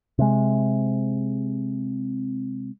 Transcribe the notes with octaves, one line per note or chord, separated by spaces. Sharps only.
C3 G#3